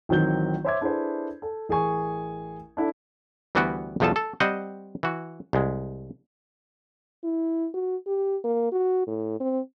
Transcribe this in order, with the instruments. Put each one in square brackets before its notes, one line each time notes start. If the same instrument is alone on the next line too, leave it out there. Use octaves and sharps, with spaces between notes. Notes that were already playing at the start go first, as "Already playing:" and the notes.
[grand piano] A1 D#3 F#3 C4 G6 G7
C5 C#5 E5 C6 D6 G#6
D4 E4 G#4 A4 B4 C5
A4
A1 G#4 A#4 G#5 C#6
D4 E4 A4
[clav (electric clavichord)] D2 E3 G3 B3 F#4 G5
B1 E2 F3 F4 A4 A5
A4
G3 C4 C5 D#5 F#5
E3 F#4
C2 G#3
[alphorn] E4
F#4
G4
A#3
F#4
A2
C4